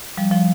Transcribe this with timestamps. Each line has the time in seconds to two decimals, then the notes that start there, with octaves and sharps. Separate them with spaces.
0.17 F3 G3
0.31 F3